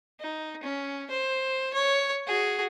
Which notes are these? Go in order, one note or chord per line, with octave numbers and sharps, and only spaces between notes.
D#4
C#4
C5
C#5
F#4 G#4